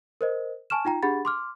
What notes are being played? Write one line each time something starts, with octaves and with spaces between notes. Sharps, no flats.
A#4 C5 D#5
G#5 A5 C#6 F6 E7
D#4 F4 G5 A#5
D4 G4 G#4 F#5 B5 A6
C6 D6 F6